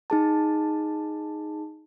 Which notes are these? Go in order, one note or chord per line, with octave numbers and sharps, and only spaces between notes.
D#4 G#4 A5